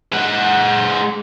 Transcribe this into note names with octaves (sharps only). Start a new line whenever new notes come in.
G#3 F#5